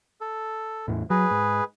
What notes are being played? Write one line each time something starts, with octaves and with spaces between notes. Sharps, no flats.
A4
E2 A2
F#3 G#4 B4
G#2